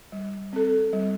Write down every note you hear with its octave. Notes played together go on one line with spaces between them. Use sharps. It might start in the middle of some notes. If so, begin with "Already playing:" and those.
G3
C4 A4
G3